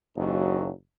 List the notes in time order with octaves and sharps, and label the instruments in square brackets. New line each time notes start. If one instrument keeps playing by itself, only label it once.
[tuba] F#1 [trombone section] D#2 F#3